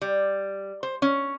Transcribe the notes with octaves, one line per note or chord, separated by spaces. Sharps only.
G3
C5
C#4